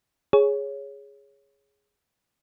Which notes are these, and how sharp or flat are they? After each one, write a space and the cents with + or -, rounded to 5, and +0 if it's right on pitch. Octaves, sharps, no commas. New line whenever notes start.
G#4 +0 C#5 +0